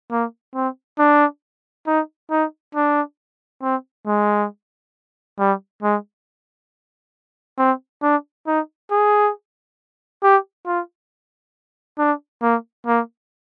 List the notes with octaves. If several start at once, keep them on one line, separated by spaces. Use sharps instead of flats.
A#3
C4
D4
D#4
D#4
D4
C4
G#3
G3
G#3
C4
D4
D#4
G#4
G4
F4
D4
A#3
A#3